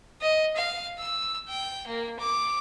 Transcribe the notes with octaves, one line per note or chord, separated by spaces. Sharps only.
D#5
F5
E6
G5
A#3
D6